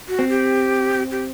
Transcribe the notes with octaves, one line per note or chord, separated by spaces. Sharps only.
F#4
C4
G4
G4